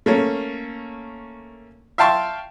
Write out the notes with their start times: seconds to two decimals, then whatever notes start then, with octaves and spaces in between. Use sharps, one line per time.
0.06 A3 A#3 C#4
1.98 E5 F5 G5 A5 C6 C#6